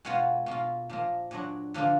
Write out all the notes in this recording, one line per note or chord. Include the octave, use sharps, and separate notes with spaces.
B2 G#3 B3 F4
B2 A#3 F4
A#2 F3 A#3
A#2 F#3 D4 F#4
D3 F3 A#3 F4